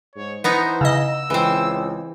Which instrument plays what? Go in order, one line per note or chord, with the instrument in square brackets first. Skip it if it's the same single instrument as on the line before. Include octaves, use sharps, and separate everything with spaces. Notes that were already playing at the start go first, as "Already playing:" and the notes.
[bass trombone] G#2 [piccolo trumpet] C#5
[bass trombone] E3 [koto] B3 D#4 A#5 [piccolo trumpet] C5
[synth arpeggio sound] C#3 D#5 [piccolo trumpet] E6
[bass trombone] C#2 [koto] E3 C4